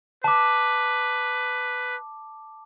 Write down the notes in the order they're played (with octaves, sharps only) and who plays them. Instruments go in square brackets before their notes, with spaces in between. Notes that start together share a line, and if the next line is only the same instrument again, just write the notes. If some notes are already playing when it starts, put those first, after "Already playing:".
[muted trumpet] B4 [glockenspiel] A5 D6